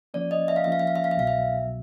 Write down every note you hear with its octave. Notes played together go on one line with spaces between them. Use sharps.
F3 A#3 C#4 D5
D#5
E5
F5
F3 A#3 C#4 E5
F5
E5
F5
E5
F5
E5
C2 B2 F#3 B3 F5
E5